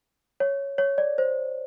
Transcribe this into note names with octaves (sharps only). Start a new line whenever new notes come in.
C#5
C#5
D5
C5